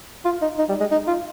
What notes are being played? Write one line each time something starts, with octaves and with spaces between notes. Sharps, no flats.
F4
D#4
D#4
G3
G#3
D#4
F4